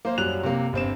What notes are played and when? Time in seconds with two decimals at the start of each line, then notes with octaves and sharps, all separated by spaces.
0.05 A#3 C5 F5
0.18 F#2 F#3 G3 F#6 F7
0.43 C3 A#3
0.73 G1 C4 E7